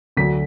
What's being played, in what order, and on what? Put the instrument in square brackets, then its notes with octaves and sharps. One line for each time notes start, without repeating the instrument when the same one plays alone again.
[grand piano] D2 D3 F#3 B6